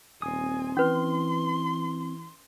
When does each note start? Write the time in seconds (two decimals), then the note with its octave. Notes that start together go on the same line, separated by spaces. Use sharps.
0.22 D#1 C4 G#5 D#6
0.77 E3 C#4 B4 C6